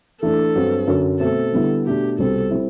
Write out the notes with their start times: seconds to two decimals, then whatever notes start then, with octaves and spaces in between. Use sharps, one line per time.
0.22 E3 A3 D4 A4
0.55 G2 F#3 C4 F#4
0.87 F#2 D3 F#3
1.20 B2 A3 C4 A4
1.52 D3 G3 B3 E4
1.86 B2 A3 D4 G4
2.18 C2 B2 G3 C4 A4
2.51 G3 C4 E4